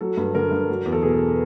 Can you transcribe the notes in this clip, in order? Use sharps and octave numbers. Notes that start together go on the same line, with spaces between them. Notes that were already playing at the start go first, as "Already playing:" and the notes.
F#3 A4
G2
D3 A#4
G2
F#3
E2
A4
B2 G#4